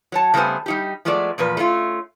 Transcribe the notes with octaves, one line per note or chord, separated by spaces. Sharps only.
F#3 C#5 A5
C#3 G3 A3 B3 C5 G#5
G3 D#4 G4
F3 G#3 A3 B3 F4 D5
E2 A#2 F3 B4
A3 C#4 D4 F4